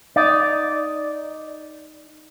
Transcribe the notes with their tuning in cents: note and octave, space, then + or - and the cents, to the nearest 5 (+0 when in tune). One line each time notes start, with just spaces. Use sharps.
D#4 +0 D5 +0